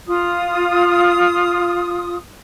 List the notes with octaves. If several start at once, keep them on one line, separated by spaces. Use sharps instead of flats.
F4 D#6